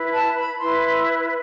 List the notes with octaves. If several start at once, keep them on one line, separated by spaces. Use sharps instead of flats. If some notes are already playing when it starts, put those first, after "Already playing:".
Already playing: E4 B4
B5
A5
B5
E4 B4 C6
C6